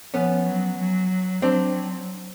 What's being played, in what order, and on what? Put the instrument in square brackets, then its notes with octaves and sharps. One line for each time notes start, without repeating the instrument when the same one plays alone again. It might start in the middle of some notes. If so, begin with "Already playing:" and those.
[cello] F3 [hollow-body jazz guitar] B3 C#4
[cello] F#3
F#3
[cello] F#3 [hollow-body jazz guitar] C4 D4